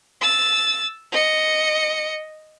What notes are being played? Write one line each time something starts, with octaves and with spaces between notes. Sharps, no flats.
E6 A6
D#5 C#7